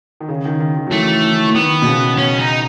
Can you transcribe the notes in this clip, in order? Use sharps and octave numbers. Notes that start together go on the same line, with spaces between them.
D#3
C#3
D#3
D#3
D#3
F#3
E3 A3
E3
E3
D#3 B3
B2
C#3
C#4
D#4